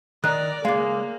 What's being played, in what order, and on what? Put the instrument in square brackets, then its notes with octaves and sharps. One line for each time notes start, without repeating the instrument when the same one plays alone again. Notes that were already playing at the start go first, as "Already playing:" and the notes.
[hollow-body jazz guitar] D#3 D#5 [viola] A#4 D5 [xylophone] F#6
[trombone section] C#3 G#4 [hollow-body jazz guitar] G#3 D5 [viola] A#3 [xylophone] F5